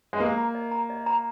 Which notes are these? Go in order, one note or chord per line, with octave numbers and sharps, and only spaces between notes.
G#3
A#3 A#4
A#5
D#5
A#5
D#5
A#5